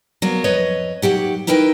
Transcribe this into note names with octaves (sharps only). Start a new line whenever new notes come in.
F#3 A#3 B3
F2 B4 C#5 D#5
D#2 F#3 G4 F#5
D#4 E4 A#4 B4 G5